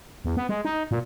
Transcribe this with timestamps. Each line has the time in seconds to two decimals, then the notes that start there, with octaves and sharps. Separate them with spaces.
0.25 E2
0.37 B3
0.49 G#3
0.65 D#4
0.91 A#2